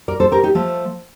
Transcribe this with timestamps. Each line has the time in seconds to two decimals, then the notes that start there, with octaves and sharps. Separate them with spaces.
0.08 A#4 D5
0.20 A4 C5
0.32 G4 A#4
0.43 D#4 G4
0.55 F3 A3